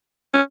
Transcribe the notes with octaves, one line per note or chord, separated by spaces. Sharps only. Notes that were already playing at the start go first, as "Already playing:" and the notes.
C#4